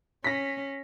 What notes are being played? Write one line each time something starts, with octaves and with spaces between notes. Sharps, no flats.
C#4 A#6 B6